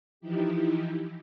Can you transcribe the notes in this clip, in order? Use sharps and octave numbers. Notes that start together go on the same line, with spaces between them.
E3 F3 D#4 E4 G4